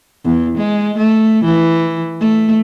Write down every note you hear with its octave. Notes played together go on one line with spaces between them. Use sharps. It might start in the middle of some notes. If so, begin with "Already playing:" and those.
E2
G#3
A3
E3
A3